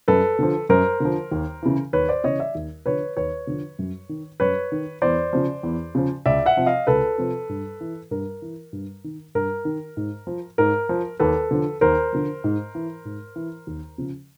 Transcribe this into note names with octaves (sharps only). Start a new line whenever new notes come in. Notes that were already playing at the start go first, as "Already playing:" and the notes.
F#2 A4 B4
D3 F3
F#2 A#4 C5
D3 F3
D#2
C#3 E3
D#2 B4 C#5
C5 D5
C#3 E3 C#5 D#5
D5 E5
D#2
D3 F3 B4 C#5
D#2 B4 C#5
D3 F3
F#2
D#3
F#2 B4 C#5
D#3
E2 C5 D5
C#3 F3
E2
C#3 F3
C#2 D5 E5
E5 F#5
C3 F3
D#5 F5
C#2 A4 B4
C3 F3
G2
E3
G2 A#4
E3
G2
D#3
G2 A#4
D#3
G#2
F3
G#2 A#4
F3
D#2 A4 B4
D3 F3
D#2 A#4 C5
D3 F3
G#2
E3
G#2
E3
D#2
C#3 F3